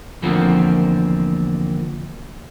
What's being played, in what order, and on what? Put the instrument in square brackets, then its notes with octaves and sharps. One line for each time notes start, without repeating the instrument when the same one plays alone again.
[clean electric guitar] E2 D3 F3 A3 A#3 C4